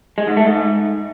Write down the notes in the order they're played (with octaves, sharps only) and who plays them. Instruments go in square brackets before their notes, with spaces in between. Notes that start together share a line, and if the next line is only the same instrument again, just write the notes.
[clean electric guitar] G#3
G#2
A3
G#2